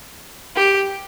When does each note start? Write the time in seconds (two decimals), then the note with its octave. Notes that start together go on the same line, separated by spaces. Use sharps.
0.56 G4